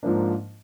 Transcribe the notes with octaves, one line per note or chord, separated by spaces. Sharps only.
G#2 F3 A#3 D4